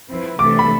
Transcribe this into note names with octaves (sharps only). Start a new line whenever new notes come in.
F3 C4 E4 B4
C3 E3 A3 D4 A4 D6
B5